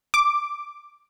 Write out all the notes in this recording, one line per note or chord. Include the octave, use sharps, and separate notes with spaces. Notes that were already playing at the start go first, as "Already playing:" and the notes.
D6